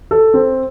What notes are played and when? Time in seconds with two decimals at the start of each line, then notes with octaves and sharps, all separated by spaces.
0.11 A4
0.34 C4